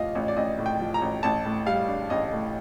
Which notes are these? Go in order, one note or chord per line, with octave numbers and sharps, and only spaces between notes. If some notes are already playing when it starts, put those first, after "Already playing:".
Already playing: A1 A2 F3 D#5 F5
A1
D5
A1 D#5
A2
G5
F3
A#5
A1
A1 A5
A2
G3 F5
D4
A1 D#5
A2